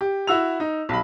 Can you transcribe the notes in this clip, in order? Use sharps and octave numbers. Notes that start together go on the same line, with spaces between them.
G4
E4 F#4 E6 F7
D#4
B1 B5